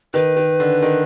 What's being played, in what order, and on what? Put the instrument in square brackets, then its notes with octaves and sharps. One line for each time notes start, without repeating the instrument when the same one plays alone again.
[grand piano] D#3 [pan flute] B4
[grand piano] D#3
D3
D#3